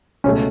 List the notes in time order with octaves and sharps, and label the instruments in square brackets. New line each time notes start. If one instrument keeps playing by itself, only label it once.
[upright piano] C#2 B2 A3 [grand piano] C#4